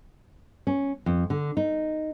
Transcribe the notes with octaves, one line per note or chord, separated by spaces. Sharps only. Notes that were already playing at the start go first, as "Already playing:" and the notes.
C#4
F2
D3
D#4